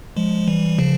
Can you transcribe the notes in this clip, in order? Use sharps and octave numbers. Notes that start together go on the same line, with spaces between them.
F3 G#3
E3 G3
C#3 F3